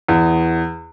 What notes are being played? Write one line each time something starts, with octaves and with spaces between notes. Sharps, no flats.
E2